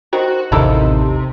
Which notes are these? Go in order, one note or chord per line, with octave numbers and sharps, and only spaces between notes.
D#3 F#4 C5
A1 D#2 C3 A#3 D#4 E4 A4